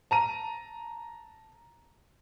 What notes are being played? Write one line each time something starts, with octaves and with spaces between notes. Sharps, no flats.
A5 A#5 D#7